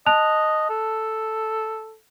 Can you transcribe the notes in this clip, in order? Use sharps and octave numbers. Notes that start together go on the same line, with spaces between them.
D#5 A5 F#6 F7
A4